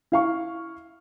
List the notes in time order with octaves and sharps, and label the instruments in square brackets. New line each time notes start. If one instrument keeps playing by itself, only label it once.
[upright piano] E4 F5 C#6